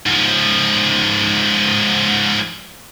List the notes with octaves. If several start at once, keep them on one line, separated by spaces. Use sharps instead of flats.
G#2 F3